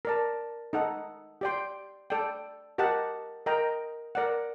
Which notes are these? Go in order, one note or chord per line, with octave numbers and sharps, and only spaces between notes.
A#4 D5 A5
D#4 A4 D#5 F#5
G4 D5 G5 C6
A4 D5 G5
G4 A#4 D#5 F#5 A5
A#4 D#5 G5 A#5
A#4 D5 F#5